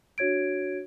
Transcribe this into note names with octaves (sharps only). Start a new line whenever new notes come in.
D4 F#4 C#5 G#6 D7